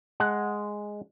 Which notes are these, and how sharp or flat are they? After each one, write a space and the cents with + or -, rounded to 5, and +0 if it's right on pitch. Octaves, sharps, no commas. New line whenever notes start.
G#3 +0 F#5 +0 A5 +0